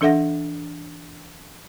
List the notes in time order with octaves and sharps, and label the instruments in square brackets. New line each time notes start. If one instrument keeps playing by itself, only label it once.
[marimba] E3 D4 A4 E5 F#5 A#6